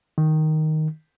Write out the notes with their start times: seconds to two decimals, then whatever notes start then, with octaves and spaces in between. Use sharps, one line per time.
0.18 D#3